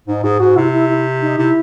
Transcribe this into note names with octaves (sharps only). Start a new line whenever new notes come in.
G#2 D#4
G#2 G#4
G#2 F#4
C3 E4
E4
E4
D#4
C3 E4